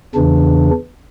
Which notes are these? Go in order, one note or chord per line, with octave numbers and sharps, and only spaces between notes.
E2 C#3 E3 D4